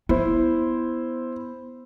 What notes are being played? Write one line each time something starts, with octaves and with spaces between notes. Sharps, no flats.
B3 E4 C5